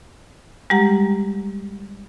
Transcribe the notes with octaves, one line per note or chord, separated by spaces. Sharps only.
G3 G#3 G4 F#5 A#5